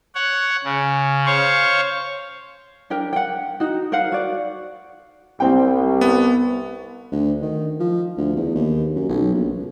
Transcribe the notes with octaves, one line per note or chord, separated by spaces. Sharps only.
C#5 F#5
C#3
C5 C#5 F5 C#6
D4 G4 A#4 G5
F#5 G5
D#4 F#4
A#4 C5 F5 F#5
F#4 D5
C2 C4 G5
B3
D2
D#3
F3
D2
E2
D#2
F#2
B1
A#1
C#2